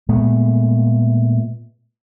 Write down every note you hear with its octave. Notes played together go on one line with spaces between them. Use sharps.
A#2 G#3 A3 B3